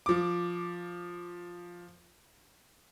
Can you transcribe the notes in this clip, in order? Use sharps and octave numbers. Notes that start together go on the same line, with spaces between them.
F3 D6